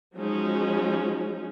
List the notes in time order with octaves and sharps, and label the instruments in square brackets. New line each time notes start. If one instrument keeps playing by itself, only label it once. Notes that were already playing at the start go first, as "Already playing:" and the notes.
[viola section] F3 F#3 G#3 C#4 D#4